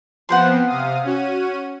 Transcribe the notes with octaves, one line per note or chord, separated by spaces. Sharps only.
F3 B3 C4 F#5 G5 C6
C3 F5 D#6
C#4 F#4 D#7